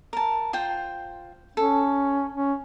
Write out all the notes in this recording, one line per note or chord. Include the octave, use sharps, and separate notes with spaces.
A#4 A5
F4 C5 G5
C#4 A4
C#4